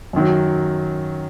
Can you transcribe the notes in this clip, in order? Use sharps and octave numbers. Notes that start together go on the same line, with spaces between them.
F#2 D#3 F#3